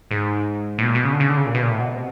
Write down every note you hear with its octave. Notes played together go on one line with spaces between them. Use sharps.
G#2
A2
B2
A#2
B2
C#3
D3
C#3
D3
C#3
A#2
B2
A#2
A2
B2
C3